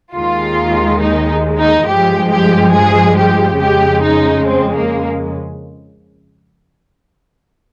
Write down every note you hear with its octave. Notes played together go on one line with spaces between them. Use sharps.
D#2 D#3 G#3 F4
D#4
D#4
G2 F3 G#3 G4
G4
G#4
G4
F2 C#3 G#3 G4
D#4
C4
A#3